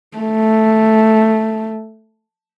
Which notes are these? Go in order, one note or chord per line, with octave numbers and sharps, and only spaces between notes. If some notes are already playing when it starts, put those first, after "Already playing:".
A3